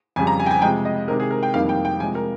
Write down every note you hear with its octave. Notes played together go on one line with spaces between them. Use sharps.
F2 C#3 G3 G#5
A#5
G#5
G5
G#5
C3 F3 G#3 G5
D#5
C3 D#3 G#3 A#4
G#4
A#4
G5
F2 C3 D#3 G3 A#3 F5
G5
G5
C3 F3 G#3 G#5
A#4